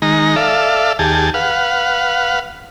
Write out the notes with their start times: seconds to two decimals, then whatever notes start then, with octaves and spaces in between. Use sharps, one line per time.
0.02 D#3 G#3 D#4 A#5
0.36 A4 D5 E5 F5
0.99 D#2 G4 G#4 A5
1.34 B4 F5 F#5